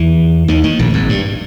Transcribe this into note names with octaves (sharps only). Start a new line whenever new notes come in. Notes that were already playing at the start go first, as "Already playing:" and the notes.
Already playing: E2 E3
D#2 D#3
D#2 D#3
A#1 A#2
G#1 G#2
G2